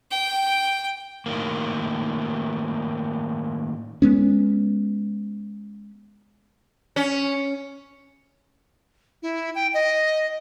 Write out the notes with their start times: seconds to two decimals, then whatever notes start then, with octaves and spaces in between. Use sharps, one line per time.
0.11 G5
1.26 A2 D#3 A#3
4.02 G#3 B3 C#4
6.96 C#4
9.23 E4
9.55 G5
9.74 D#5